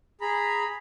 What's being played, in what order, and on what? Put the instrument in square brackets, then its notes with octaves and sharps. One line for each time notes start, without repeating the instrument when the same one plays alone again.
[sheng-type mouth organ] G#4 A#5 B5